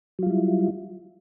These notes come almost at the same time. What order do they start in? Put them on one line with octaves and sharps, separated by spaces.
F#3 F4 G3 E4